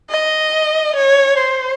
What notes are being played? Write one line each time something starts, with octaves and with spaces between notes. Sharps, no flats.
D#5
C#5
C5